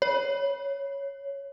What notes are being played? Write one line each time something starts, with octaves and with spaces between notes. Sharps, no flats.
C#5